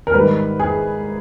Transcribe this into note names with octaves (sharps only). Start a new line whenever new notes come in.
A#4
G#2 D#3 G3 B4
G#4